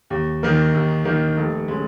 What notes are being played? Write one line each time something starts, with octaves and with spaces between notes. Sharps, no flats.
D#2
D#3 A#3 D#4 A#4
D#2
D#3 A#3 D#4 A#4
F1
C#3 G#3